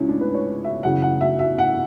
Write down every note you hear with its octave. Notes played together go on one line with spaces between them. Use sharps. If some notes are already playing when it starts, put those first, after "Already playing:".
Already playing: C#2 C#3 C#4 E4
D4
B4
C#5
E5
F#2 C#3 E3 F#5
F#5
E5
E5
F#5